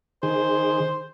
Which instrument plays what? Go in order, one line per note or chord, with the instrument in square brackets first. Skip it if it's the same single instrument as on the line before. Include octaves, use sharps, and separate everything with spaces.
[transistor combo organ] D#3 G#4 [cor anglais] C5